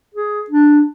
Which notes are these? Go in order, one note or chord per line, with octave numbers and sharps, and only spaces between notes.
G#4
D4